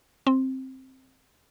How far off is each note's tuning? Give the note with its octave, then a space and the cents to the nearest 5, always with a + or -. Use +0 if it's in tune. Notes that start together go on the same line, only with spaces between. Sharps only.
C4 +10